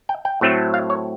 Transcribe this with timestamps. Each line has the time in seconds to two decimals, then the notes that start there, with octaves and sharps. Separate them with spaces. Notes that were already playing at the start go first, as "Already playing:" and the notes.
0.09 G5
0.25 G5
0.41 A2 F#3 A3 C4
0.74 F5
0.90 C#5